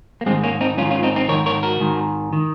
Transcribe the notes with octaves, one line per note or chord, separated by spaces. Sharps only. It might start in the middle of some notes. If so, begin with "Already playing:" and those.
A#3
G#2 D#3 G#3 C4
A#3 C#4
C4 D#4
G#2 D#3 C#4 F4
C#4 F4
C4 D#4
C4 D#4
G#2 D#3 A#4 C#5
A#4 C#5
F#4 A#4
G#2 D#3
D#3